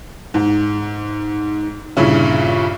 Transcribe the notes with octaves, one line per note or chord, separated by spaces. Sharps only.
G#2
G2 A#2 C#3 C#4 E4